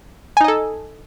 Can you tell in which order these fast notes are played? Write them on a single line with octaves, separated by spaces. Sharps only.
G#5 D#4 D#5 A4